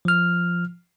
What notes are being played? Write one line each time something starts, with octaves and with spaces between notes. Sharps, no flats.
F3 F6